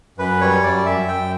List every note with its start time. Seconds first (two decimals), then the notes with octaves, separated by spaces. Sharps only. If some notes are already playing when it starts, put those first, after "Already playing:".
0.18 F#2 B4
0.41 G3 C#5
0.63 F#2 D5
0.86 F#2 E5
1.08 F#2 G5